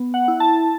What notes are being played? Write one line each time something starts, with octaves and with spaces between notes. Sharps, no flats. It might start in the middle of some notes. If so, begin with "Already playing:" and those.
Already playing: B3
F#5
E4
A5